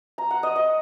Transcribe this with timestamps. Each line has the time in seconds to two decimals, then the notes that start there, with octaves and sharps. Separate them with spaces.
0.18 A#5
0.31 F#5
0.43 D#5
0.56 D#5